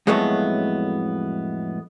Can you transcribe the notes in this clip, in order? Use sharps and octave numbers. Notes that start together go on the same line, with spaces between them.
F2 A2 F#3 G#3 A3 B3